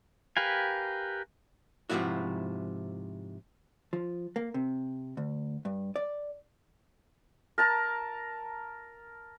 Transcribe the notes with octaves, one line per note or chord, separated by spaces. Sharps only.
G4 A#4 B4 F5 G#5
G#2 C3 D#3 F3 E4 F#4
F3
A#3
C3
D2
G2
D5
A#4 A5 A#5